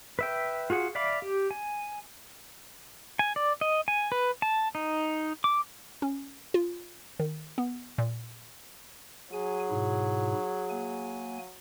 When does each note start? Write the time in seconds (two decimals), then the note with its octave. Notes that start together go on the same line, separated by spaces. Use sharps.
0.19 B4 E5 G5
0.70 F4 F#4 G#4 F#5
0.95 D5 E5 F5 B5 D6
1.22 G4
1.51 G#5
3.19 G#5
3.36 D5
3.61 D#5
3.88 G#5
4.12 B4
4.42 A5
4.75 D#4
5.44 D6
6.02 C#4
6.54 F4
7.19 D#3
7.58 B3
7.98 A#2
9.33 F#3 G#4 G#5
9.70 G#2 B2 E4
10.70 A#3 G#5